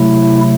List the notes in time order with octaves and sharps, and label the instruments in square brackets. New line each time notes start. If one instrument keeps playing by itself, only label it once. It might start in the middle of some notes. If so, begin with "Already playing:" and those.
Already playing: [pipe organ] C3 F#3 A3 E4